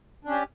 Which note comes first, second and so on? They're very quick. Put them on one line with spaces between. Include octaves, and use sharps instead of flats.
D4 C#4 G4